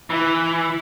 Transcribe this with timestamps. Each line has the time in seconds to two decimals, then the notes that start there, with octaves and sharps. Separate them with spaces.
0.10 E3 E4
0.42 E4